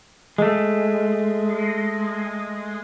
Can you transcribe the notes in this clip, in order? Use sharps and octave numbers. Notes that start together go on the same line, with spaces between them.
G#3 A3